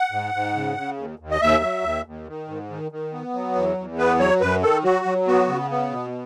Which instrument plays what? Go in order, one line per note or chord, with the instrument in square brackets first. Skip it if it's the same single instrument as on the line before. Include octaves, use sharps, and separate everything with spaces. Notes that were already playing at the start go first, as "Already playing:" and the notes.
Already playing: [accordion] F#5
G#2
G#2
C#3
C#3
D#2
D#2
D#5
D#2 E5
F#3
D#2
D#2
D#3
G#2
D#3
D#3
B3
F#3
E2
E2
B3 B4
F#3 C#5
F#2 B4
D#3 A4
F#3 F#4
F#3
B3 F#4
C#3
B3
B2